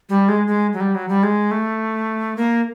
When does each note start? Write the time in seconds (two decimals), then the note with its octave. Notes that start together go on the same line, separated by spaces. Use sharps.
0.09 G3
0.28 G#3
0.47 G#3
0.73 F#3
0.80 G3
0.95 F#3
1.09 G3
1.23 G#3
1.51 A3
2.37 A#3